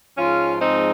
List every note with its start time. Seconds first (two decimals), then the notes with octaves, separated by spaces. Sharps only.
0.18 G#2 F3 G#3 C#4 F4
0.59 C4 D#4